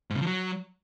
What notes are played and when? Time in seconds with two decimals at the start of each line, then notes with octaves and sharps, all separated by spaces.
0.10 G#2
0.16 C#3
0.21 F3
0.26 F#3